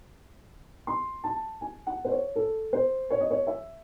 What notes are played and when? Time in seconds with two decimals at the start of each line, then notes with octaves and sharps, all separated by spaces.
0.87 C6
1.24 A5
1.61 G#5
1.87 F#5
2.05 C5
2.11 C#5
2.36 A4
2.73 C5
3.11 C#5
3.20 D#5
3.31 C#5
3.47 E5